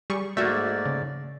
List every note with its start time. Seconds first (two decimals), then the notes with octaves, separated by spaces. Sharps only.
0.10 G3 G#4 C#6
0.37 G#2 A3 A#3 F#4 D5 E5
0.86 C#3